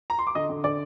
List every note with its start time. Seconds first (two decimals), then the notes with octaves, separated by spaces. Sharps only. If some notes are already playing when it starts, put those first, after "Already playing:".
0.10 A#5
0.19 C6
0.27 D6
0.35 D3 D#5 D#6
0.49 D3
0.64 D3 D5 D6